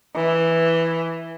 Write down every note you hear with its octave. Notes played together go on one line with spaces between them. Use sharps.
E3